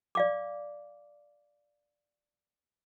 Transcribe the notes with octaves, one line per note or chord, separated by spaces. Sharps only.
D5 F5 D6